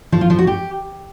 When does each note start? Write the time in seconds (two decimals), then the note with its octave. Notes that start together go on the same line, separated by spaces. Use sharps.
0.12 F3
0.21 F4
0.30 F3
0.39 F#4
0.47 G4